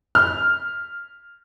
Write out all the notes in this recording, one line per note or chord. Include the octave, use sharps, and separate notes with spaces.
F6